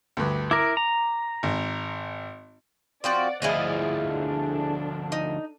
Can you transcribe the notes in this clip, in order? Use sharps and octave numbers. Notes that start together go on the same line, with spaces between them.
D2 G2
E4 A#4 D6
A#5
G#1
F3 C4 F#4 D5 F#5
D2 F3 E4 G#4 D5 D#5
D4 A4
D#4